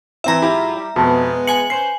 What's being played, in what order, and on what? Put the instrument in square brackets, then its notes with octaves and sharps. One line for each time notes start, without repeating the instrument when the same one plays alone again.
[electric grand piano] E3 C4 E4 [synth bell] E5 A#5
[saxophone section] G#2 F#3 F4 [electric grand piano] E4 G4
[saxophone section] G3
[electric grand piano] F2 B2 A5 [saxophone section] G#3 B3
[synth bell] G#5 F#7 [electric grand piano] C#7
[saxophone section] C#4 B4 C5 [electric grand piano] C7